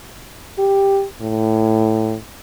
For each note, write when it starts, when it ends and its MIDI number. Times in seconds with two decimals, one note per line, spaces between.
0.59 1.05 67
1.22 2.16 45